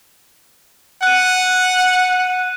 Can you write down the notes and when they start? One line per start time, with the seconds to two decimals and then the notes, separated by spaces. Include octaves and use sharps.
1.03 F#5 F#6 D#7